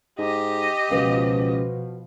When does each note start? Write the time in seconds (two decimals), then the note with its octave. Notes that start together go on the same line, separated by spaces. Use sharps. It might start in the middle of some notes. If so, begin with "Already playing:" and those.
0.19 G#2 G4 D#5
0.91 C#2 B2 F3 F#4 B4 F5